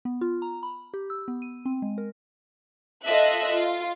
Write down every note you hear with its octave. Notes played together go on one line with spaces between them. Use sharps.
B3
F4
A#5
B5
G4
E6
B3
D#7
C4
G#3
A#4
F4 A4 D#5 E5 F#6
F4